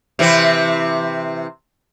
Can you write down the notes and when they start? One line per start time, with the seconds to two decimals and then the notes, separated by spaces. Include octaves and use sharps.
0.19 C3 E3 C4